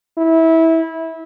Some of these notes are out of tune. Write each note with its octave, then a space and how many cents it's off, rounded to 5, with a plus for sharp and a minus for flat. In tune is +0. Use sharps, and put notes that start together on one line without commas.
E4 -20